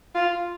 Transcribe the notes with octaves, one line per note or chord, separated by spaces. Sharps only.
F4